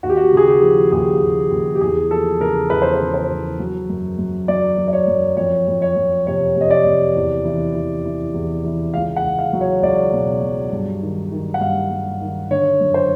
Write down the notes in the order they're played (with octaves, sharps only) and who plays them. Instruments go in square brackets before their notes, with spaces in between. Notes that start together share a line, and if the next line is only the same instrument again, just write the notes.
[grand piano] D#2 F#4
G4
F#4
C#3 G#4
G4
F3
D#2 G#4
D#2
D#2
G4
E2 G#4
F3 A4
C#3 A#4
E2 B4
C5
B4
C#3
C5
E2
F#3
F#2
F#2
F#3 D5
F#3
D5
C#5
F#2
F2 C#5
F2
C#5
F2
C3 C#5
C3 D#5
D5
C3
E2
E3
E3
E3
E2
E3
C#2 F5
F#5
C#2
F5
F#3
C#5
C#2 D5
B2
F#3
G2
D#3
D#3
F#5
G2 F5
G2
D#3
D3 C#5
F#2
C5